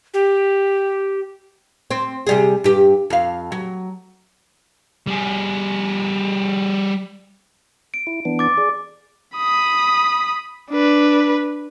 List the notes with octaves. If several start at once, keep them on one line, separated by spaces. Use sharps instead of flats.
G4
C4
C3 G3 G#4
G2 G4
F2 F5
F#3
G3 G#4
D7
E4
E3 B3 D4
D6 A6
G#4 D5
B5 D#6
D4 B4